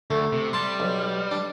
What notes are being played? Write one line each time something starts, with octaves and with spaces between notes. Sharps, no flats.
D2 A3
C3
G3 A5 C6
B1
D4